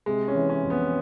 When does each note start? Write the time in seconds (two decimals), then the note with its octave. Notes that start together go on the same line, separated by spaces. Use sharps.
0.06 C3 G#3
0.28 C#4
0.35 E3
0.49 C#4
0.63 F2
0.70 B3